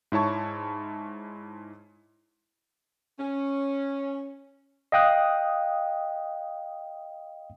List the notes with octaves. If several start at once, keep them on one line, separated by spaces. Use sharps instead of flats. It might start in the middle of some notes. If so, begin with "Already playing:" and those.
G#2 E4 C#5 A5 C#6
C#4
D#5 F5 G5 D#6 F#6